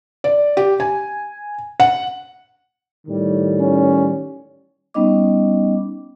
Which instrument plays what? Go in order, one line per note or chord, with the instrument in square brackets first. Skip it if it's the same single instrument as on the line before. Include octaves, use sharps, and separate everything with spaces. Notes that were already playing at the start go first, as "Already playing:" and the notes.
[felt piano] D5
G4
G#5
F#5
[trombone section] A2 D#3 G3
[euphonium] C#4
[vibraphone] G3 B3 C#4 D#4 D#5 D6